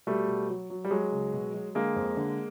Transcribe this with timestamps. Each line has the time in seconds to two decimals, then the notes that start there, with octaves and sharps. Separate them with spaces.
0.07 B2 G3 A3
0.28 B2
0.49 F#3
0.70 F#3
0.84 G3
0.91 F#3 G#3
1.12 C#2
1.33 B2
1.54 F#3
1.75 D3 G#3 A#3
1.96 F2
2.17 D3